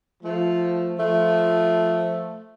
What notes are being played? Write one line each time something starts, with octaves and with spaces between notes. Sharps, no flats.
F3 A3
F3 A3